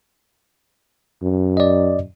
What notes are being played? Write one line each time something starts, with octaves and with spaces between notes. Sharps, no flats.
F#2
D5 D#5